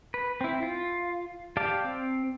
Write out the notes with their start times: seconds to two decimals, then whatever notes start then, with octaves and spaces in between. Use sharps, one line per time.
0.14 B4
0.41 C4 E4
0.63 F4
1.57 G4 D5 F5 G5 A5
1.84 C4